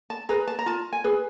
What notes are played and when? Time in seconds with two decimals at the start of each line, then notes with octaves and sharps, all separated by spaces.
0.10 A5
0.29 G#4 B4 A#5
0.48 A5
0.59 A#5
0.66 F4 A5
0.93 G#5
1.04 G#4 B4